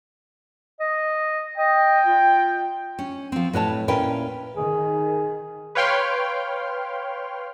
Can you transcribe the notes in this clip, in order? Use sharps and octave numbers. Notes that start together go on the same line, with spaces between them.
D#5
D#5 G5
F4
C#4
F3 C4
A2 B4 C#5 A5
A#2 C#4 E4 B4 G5
D#3 G#4
B4 C#5 F5 G5 C6 F6